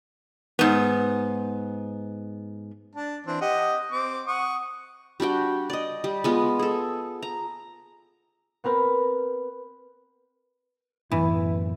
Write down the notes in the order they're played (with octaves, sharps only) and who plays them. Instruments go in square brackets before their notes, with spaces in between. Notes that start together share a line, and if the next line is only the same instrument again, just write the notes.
[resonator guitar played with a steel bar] G#2 B3
[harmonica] D4 A5
E3 C4 D4
G4 D#5 F#5
C4 D6
F#5 C#6 D#6
[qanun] G3 D4 F#4 G5
D5 D#5
G3
G#3 B3 F4
G#4 A4
A#5
[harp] B3 C4 A#4 B4
[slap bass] F#2 A2 B3 [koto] E3 [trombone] E4